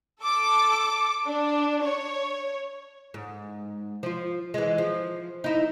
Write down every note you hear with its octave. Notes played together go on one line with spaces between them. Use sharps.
A4 D6
D4
C#5
G#2
F3 F4
E3 G#3
F3
D#4 E4